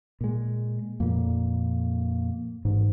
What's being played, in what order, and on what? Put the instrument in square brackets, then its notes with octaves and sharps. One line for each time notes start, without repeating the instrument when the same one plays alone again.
[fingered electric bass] A#2 G#3
[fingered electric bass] F2 A#2 [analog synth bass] A#3
[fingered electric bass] A1 [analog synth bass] G#2